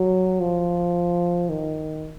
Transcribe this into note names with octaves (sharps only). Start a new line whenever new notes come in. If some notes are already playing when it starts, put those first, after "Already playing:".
Already playing: F#3
F3
D#3